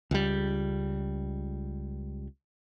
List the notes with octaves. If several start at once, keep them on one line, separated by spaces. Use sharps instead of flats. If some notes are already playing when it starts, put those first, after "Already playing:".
C#2 G3